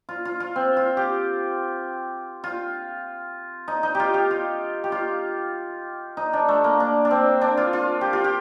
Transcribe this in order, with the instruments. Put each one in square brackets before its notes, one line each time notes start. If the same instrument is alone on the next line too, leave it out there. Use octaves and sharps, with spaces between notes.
[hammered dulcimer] F4
F4
F4
C4
F4
G4
F4
D#4
D#4
F4 G4
G4
F4
G4
F4
D#4
D4
A3
A#3
D4
D4
C4
D4
F4
F4
G4
F4
G4